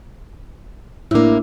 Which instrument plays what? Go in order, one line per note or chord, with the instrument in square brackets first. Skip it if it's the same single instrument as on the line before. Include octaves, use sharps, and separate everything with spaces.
[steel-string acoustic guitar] A2 A#3 [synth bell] D4 E4